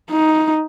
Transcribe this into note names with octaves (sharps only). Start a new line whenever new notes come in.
D#4